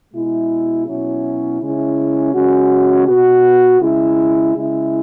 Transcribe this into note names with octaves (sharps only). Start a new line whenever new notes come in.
B2 G#3 E4
B2 F#3 C#4 E4
C#3 G#3 C#4 E4
C#3 G#3 C#4 F#4
B2 B3 F#4
C#3 G#3 E4
C#3 G#3 E4